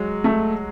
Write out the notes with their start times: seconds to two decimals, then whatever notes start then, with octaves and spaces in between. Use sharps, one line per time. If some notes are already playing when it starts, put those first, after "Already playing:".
Already playing: F#3 G#3
0.24 A3